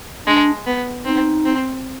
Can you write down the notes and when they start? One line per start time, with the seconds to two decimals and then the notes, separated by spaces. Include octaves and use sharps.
0.27 G#3 D4
0.66 B3
1.05 C4 D#4
1.45 C4